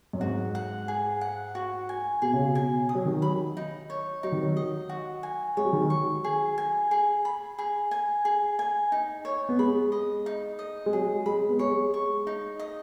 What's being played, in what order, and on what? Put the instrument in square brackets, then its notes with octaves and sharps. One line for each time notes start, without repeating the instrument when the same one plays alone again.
[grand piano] F#2
[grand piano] G#2 [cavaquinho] F#4
[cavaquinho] F#5
G#4
F#5
F#4
G#5
[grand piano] B2 [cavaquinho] G#4
[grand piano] C#3
B2
[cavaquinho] G#5
D#6
[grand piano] F#3
D#3
[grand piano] F#3 [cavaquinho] B5
[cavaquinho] D#4
C#5
[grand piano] F#3 [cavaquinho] D#4
[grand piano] D#3
F#3
[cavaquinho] D#5
F#4
G#5
[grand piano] G#3 [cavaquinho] C#5
[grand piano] F#3
D#3
F#3
[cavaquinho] C#6
G#4
G#5
G#4
B5
G#4
G#5
G#4
G#5
D#4
C#5
[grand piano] B3
[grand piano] G#3 [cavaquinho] B5
[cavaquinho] D#5
D#4
D#5
[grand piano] G#3
[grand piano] F#3 [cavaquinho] G#4
[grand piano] G#3 [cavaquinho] B5
[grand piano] B3
[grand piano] G#3 [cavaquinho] C#5
[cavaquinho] C#6
D#4
D#5